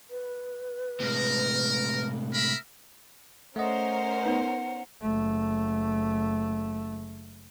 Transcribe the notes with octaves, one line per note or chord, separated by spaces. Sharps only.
B4
A2 C3 G#3 A#4
A#4 E5 B5
A3 C#4 A#4 C5 D#5 F#5
B3 D#4 B4
F#1 A3